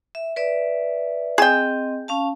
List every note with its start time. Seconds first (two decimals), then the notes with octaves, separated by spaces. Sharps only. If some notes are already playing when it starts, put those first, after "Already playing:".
0.15 E5
0.36 B4 D5 E5
1.38 C4 G#4 D#5 G5
2.08 C#4 F5 A5